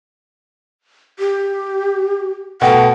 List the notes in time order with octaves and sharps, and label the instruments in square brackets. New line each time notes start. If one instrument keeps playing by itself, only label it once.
[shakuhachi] G4
[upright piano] B2 A3 G5 [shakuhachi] F#5